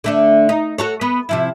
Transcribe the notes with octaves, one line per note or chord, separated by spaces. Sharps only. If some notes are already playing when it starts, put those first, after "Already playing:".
D3 A3 D4
D#4
F#4 A4 C#5
B3
C3 F3 E4